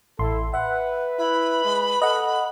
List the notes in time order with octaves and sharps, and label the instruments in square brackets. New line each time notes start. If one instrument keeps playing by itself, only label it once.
[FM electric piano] A1 C6 [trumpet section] E4 [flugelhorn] A4
[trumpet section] B4 [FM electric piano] E5 [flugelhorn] F#5
[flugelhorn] E4 [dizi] B5
[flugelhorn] G#3
[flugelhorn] A4 [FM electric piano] D#5 F#5